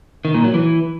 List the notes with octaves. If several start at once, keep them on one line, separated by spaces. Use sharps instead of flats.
D#3
A#2
F#3
E3